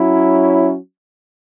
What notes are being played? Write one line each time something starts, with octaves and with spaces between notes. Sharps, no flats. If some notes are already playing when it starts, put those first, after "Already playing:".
Already playing: F#3 C#4 E4